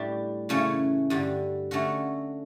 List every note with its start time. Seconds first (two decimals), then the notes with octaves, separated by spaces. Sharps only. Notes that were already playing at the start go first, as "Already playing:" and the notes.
Already playing: A2 G3 D4 G4
0.49 F#2 C#3 E3 A3 C#4
1.10 G2 D3 G3
1.71 D3 A3 C#4 F#4